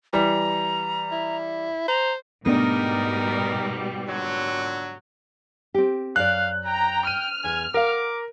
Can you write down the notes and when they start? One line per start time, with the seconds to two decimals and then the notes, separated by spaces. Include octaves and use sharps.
0.13 E3 G3 A#5
1.11 E4
1.88 C5 A#5
2.46 G#2 B2 G3 A3 B3 D4 D#4 A#4
4.07 A#2 D3 F#3
5.74 C4 G4
6.16 F#2 D5 F5 F#6
6.66 G5 A#5
7.07 F6 D#7
7.44 E2 G#5
7.74 A#4 F5 F#5 D6